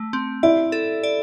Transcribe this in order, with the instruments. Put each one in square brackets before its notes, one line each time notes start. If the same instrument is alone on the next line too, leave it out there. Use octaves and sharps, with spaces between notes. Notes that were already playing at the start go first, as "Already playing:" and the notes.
Already playing: [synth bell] A3
C4
[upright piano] E4 [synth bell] D5
[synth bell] A4
D5